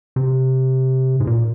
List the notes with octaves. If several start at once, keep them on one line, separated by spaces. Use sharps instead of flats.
C3
G#2
A#2